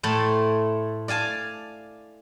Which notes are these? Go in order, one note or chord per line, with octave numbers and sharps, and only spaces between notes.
A2 A3 E4 C5 A5
D5 F5 G#5 A5